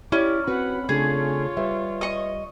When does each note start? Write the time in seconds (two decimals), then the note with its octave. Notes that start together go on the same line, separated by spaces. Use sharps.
0.12 C#4 E4 G4 D5
0.47 C4 F#4 B4 F#5 B5
0.89 C#3 A3 D4 F4 G#4 C#5
1.57 G3 B4 E5
2.01 D#5 C#6